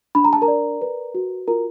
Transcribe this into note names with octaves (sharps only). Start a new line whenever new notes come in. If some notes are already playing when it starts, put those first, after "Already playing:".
D4 B5
A#5
A5
A#4 A#5
D5
B4
F#4
F4 A#4 A#5